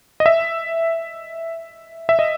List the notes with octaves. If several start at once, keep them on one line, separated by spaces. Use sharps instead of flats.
D#5
E5
E5
D#5